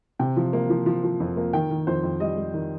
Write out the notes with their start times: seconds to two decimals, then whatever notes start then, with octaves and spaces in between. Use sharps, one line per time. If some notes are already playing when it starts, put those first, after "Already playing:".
0.19 C3 G5
0.37 F3
0.53 A#3
0.70 F3
0.86 F3
1.04 F3
1.20 F2
1.37 A#3
1.53 D#3 G5
1.70 D#3
1.87 F2 C5
2.03 F2
2.20 G3 D#5
2.37 G3
2.54 D#3